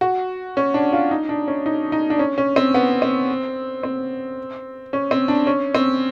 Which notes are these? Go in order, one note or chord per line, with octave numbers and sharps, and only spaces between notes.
F#4
C#4
D4
F4
D#4
D4
C#4
D#4
D#4
D4
C#4
C#4
C4
B3
C4
C4
C#4
C4
D4
C#4
C4